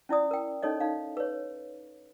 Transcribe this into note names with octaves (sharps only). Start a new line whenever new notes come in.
C#4 E4 D5 D#6
A#4 G5
C#4 D#4 A4 C#5 D#5
D#4 F5
B4 C#5